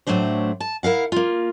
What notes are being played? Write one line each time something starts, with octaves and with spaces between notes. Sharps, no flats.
A2 F#3 A3 D4 C5
A5
E4 A#4 F5 F#5
A#3 F4